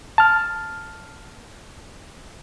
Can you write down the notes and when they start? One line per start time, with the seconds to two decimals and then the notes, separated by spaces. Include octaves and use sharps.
0.18 A5 F6